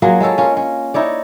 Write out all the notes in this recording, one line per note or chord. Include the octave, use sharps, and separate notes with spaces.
F#3 A#3 F4 G#4
G#3 A#3 A4 C#5
C#4 F4 A#4
C#4
D#4 E4 C#5 D5